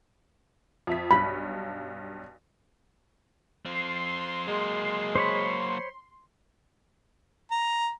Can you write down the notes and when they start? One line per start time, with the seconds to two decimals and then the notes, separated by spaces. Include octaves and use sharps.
0.87 F2 E5 B6
1.11 B1 G2 B5 B6
3.65 F3 C4 C6
4.48 F#3 G#3 A#3
5.15 C5 C#5 B5
7.51 A#5